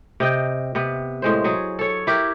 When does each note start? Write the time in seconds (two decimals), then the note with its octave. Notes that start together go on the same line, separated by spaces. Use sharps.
0.20 C3 D#5 G5
0.75 C3 B3
1.22 A2 G#3 C5
1.44 F#3 G#4
1.79 A4 C#5
2.07 E4 G4 A#4